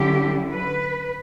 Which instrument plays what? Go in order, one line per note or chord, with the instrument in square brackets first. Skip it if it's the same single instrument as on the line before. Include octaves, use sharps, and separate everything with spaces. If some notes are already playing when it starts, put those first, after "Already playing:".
Already playing: [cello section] D3 F#3 C#4 E4 G4
B4